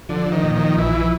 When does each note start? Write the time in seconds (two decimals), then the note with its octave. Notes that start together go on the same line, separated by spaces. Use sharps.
0.09 D3 F3
0.26 F3
0.32 D#3
0.43 A#2
0.55 D#3 F3
0.77 A#1 E3
0.95 F3